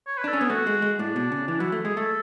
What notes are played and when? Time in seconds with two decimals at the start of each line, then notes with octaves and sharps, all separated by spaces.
0.07 C#5
0.18 B4
0.24 D4
0.28 C#4 A4
0.40 B3 G#4
0.50 A3 F#4
0.67 G#3
0.82 G#3
0.99 A2 D4
1.16 B2
1.32 C#3
1.48 E3 D4
1.60 F#3 E4
1.72 A3
1.85 G#3 G#4
1.97 A3 A4